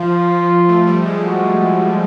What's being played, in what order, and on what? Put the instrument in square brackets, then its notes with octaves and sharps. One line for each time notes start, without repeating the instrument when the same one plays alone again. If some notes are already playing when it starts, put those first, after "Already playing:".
Already playing: [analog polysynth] F3 [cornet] F4
[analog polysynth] F3
A3
G3
G#3
[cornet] F#4